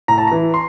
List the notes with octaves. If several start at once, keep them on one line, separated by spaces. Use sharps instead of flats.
A2 A#5
A5
E3 A#5
C6